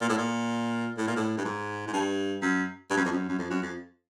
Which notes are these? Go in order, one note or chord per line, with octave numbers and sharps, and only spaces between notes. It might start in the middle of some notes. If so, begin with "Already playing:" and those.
A#2
A2
A#2
A2
A#2
A2
G2
G#2
G#2
G2
F#2
G2
F#2
F2
F#2
F#2
F2
F#2
F2